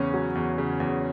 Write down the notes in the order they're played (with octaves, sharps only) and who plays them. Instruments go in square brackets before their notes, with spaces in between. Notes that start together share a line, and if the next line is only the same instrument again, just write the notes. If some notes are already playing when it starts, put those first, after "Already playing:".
Already playing: [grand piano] E2 C#3 [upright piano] C#4
[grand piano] F#3
E2
C#3
E2